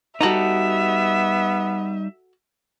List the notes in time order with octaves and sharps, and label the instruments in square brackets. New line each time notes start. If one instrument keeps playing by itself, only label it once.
[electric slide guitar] G3 D#4 [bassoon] B3 [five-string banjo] F#4 A4 A#5 [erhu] E5